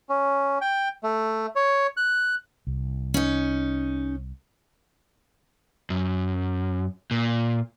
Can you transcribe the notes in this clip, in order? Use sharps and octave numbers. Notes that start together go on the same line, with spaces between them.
C#4
G5
A3
C#5
F#6
C2
C#4 D#4
F#2
A#2